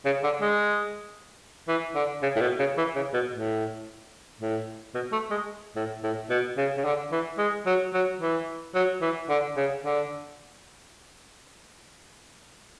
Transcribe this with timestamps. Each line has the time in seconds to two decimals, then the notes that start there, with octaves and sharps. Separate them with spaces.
0.05 C#3
0.23 D3
0.42 G#3
1.68 E3
1.95 D3
2.22 C#3
2.36 A2
2.41 B2
2.59 C#3
2.77 E3
2.95 C#3
3.13 B2
3.32 A2
4.40 A2
4.94 B2
5.12 A3
5.31 G#3
5.76 A2
6.03 A2
6.30 B2
6.57 C#3
6.77 C#3
6.84 D3
7.12 E3
7.38 G#3
7.66 F#3
7.93 F#3
8.20 E3
8.75 F#3
9.01 E3
9.29 D3
9.56 C#3
9.84 D3